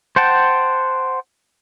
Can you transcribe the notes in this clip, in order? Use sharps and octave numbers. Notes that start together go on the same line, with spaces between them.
C5 F#5 G5 A5